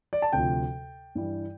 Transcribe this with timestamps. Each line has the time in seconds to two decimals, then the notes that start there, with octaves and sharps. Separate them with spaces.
0.13 D5
0.22 A5
0.33 D2 C3 F3 G5
1.15 G2 E3 G3